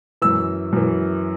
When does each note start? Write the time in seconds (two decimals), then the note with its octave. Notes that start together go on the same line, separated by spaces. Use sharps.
0.22 F#2 E3 E6
0.73 F#2 E3